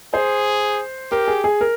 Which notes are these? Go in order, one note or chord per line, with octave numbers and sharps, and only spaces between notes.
G#4 C5
G4 A#4
G#4
G#4
A#4